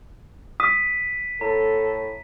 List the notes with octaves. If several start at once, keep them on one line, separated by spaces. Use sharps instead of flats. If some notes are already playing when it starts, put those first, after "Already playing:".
D#6 B6 D#7
A2 A4 A#5